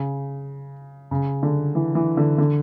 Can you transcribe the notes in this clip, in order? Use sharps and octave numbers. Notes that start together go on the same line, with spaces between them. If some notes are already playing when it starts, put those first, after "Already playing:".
Already playing: C#3
C#3
D3
E3
E3
D3
D3